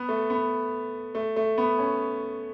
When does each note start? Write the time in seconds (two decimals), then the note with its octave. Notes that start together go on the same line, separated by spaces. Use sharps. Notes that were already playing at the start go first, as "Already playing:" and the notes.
Already playing: B3
0.09 A3
0.30 B3
1.15 A3
1.36 A3
1.58 B3
1.79 C#4